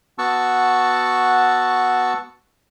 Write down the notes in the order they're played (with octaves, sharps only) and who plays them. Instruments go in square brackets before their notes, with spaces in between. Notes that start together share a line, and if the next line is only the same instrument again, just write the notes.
[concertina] B3 F#4 F#5 A5 C#6 E6